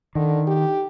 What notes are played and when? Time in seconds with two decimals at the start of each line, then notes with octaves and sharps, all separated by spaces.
0.15 D3 D#3
0.47 G4